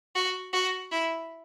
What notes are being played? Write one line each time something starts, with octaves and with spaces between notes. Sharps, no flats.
F#4
F#4
E4